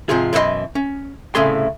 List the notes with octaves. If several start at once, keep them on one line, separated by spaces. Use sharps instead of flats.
G#2 C3 F3 F4 G#4
F#2 B2 E3 A4 D#5 C6
C#4
C2 A2 C#3 A3 G#4 C6